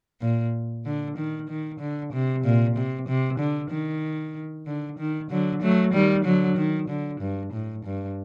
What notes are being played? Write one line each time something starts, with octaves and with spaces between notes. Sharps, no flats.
A#2
D3
D#3
D#3
D3
C3
A#2
C3
C3
D3
D#3
D3
D#3
D3 F#3
F#3 A3
D#3 G3
D3 F#3
D#3
D3
G2
A2
G2